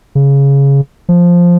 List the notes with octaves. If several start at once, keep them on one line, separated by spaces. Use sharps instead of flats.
C#3
F3